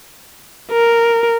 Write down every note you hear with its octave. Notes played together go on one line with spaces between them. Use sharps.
A#4